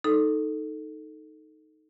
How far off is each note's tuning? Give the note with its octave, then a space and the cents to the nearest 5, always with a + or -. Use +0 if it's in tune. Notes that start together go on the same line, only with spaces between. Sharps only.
D#4 +0 A4 +0